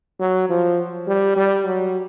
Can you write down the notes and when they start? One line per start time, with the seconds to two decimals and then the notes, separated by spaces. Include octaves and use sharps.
0.20 F#3
0.49 F3
1.07 G3
1.36 G3
1.66 F#3